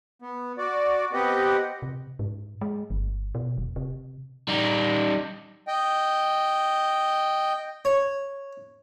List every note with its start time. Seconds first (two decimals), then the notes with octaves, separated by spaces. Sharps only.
0.22 B3
0.58 F#4 D5
1.13 B3 C4 G4 B4 D#5 F#5
1.82 C3
2.19 G#2
2.61 G#3
2.90 G1
3.35 B2
3.58 E1
3.76 C3
4.49 G3 D#4
5.68 D#5 G5
7.85 C#5